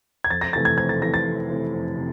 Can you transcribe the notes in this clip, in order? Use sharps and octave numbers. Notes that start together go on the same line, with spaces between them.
G#6
F2 A6
A#6
C3 E3 A3 A6
G#6
F2 G#6
A6
C3 E3 A3 A#6
A6
F2
C3 E3 A3
F2
C3